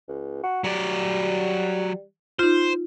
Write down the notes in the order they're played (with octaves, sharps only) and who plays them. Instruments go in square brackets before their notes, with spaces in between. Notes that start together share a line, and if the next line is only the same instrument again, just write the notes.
[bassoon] C#2
F#4
[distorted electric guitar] F#3 D5 [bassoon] G3
[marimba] D#4 F4 [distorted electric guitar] C5